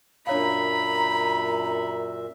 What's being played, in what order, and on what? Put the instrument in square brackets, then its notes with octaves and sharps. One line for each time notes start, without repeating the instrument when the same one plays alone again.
[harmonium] F#2 A#2 E5 [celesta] D4 C#5 F5 [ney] A#5 [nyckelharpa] B5